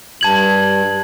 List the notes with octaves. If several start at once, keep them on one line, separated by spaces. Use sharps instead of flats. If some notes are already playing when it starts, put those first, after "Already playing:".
G2 A5 G#6 F#7